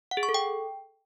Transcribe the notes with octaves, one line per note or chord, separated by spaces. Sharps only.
F#5
G#4
C#6
A4
G5